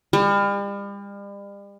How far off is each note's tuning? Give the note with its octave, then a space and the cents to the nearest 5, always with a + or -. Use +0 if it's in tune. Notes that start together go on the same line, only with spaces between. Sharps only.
G3 +40